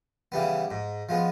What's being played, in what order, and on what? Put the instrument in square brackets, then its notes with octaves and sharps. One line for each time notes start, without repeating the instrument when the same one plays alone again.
[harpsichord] C#3 E3 G3 B3
G#2
F3 G#3 B3